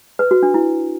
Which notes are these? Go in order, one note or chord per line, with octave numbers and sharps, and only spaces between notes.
B4
F#4
D4
E4